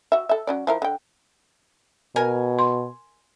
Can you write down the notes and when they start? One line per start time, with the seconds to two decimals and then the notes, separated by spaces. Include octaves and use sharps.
0.12 F#4 E5
0.29 A4 E5
0.47 F#3 C#4 D5
0.67 F3 E4 A#4
0.82 D3 G5
2.16 B2 A#4 G#5
2.59 C6